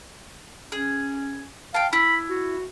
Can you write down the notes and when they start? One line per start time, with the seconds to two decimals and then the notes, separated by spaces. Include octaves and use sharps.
0.72 C#4 G#4
1.74 F5 G5 A5
1.93 E4 B5
2.30 F#4